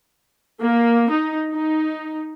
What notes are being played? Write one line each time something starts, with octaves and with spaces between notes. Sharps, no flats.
A#3
D#4
D#4